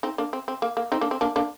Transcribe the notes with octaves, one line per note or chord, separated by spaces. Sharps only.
C4 D#4
A#3 D4
C4
C4
A#3
A#3
C4 D#4
A#3 D4
C4
A#3 D4
A#3 D4